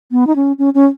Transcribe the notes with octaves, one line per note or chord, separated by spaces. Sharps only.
B3
D#4
C#4
C#4
C#4